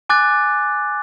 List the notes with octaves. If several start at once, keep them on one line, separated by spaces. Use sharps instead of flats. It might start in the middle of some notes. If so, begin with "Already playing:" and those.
G#5 D6 F#6 A6